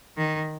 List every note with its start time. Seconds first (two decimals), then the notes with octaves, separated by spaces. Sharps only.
0.17 D#3